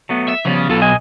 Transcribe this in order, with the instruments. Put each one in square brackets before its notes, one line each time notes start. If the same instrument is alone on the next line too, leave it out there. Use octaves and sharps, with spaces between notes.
[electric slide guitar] F#3 A3 B3
[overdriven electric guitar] E5
[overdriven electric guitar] C#3 [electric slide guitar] F3 G3 B3
[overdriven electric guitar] B1 B2 [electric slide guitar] F4 A4
[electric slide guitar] D#5 G#5